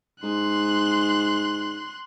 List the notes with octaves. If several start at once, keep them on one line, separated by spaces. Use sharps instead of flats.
G#2 C6 F#6